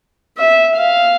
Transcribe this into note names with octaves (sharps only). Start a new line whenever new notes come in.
E5
F5